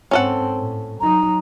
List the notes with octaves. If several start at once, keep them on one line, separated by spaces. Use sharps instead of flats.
G#2 C4 C#4 A4 F#5
A2
F#3 D#4 A#5